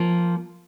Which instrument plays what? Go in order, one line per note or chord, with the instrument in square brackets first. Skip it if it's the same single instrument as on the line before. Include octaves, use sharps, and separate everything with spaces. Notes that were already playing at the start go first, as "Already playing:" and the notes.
Already playing: [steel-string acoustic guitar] F3 A#3